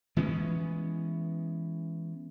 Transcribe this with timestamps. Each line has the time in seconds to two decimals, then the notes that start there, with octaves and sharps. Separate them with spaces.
0.16 E3 G#3 B3 C#4